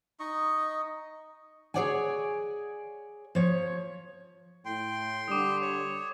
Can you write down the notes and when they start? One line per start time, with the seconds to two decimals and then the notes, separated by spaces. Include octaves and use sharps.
0.20 D#4 D#5 C#6
1.74 G#4 A#4 C#5 D5 F#5 G#5
3.35 F3 C#5
4.66 A2 G5 C6
5.28 D3 G3 D6 D#6
5.62 C#5